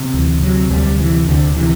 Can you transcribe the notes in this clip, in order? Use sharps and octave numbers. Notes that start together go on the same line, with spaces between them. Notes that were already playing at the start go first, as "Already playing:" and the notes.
Already playing: C3
D2 E3
C3 F#3
D2 G3
C3 E3
D2 D3
C3 E3